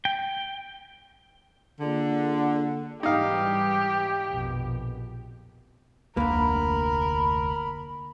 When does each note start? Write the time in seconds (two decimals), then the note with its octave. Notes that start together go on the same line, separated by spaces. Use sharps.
0.05 G5
1.81 D3 A#3 F4 G#4
3.03 G#2 E3 G3 D#4 G4 F5
4.29 A#1 F2 B2
6.17 F1 D2 D3 A#3 A#4 B5